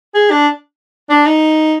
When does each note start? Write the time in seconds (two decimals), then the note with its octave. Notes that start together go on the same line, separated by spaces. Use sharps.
0.15 G#4
0.31 D4
1.10 D4
1.26 D#4